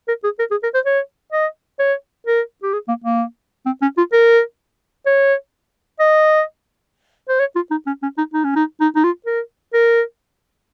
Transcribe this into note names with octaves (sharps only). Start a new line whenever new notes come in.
A#4
G#4
A#4
G#4
A#4
C5
C#5
D#5
C#5
A#4
G4
G#4
A#3
A#3
C4
C#4
F4
A#4
C#5
D#5
C5
C#5
F4
D#4
C#4
C#4
D#4
D#4
C#4
D#4
D#4
D#4
F4
A#4
A#4